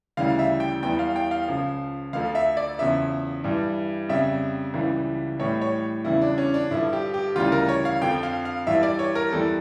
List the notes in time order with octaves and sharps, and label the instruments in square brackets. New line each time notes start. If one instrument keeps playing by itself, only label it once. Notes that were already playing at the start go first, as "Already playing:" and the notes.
[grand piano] D2 C#3 E3 G3 F5
E5
G5
E2 E3 G3 G5
F5
G5
F5
C#2 C#3 F3
D2 D3 F3 F5
E5
D5
E2 C#3 F3 E5
G2 E3 G3
F2 C#3 G3 E5
C#2 C#3 E3 G3
A2 E3 G3 C#5
C#5
E2 C#3 E3 G3 E4
D4
C#4
D4
G2 D3 F3 E4
G4
G4
D2 C#3 E3 G3 F4
A#4
C#5
F5
F2 D3 F3 G5
F5
F5
G2 E3 G3 E5
D5
C#5
A#4
E2 E3 G3 A4